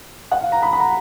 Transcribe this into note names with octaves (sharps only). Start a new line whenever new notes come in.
F#5
F5
A#5
B5
B5
A#5